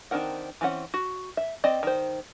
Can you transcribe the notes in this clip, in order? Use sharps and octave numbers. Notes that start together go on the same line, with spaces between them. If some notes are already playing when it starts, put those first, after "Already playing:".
D#3 C4 D4 A#4 F#5
E3 C4 C#4 F#5
F#4
E5
C4 D5 D#5
D#3 C5